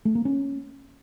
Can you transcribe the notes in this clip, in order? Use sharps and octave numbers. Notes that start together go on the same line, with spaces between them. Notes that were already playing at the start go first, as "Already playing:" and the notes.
A3
A#3
C#4